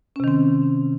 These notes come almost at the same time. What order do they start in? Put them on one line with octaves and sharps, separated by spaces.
C#4 C3 D#3 C4